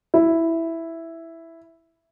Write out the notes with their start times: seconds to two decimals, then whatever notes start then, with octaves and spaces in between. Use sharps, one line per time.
0.14 E4